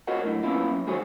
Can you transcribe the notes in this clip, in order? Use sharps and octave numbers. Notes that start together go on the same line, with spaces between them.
F4 F#4 A#4 C#5 D#5 F#5
A2 D3 F#3
F#3 A#3 B3 C#4 E4 F4
F#3
D#3 G#3 F#4 G#4 C5 C#5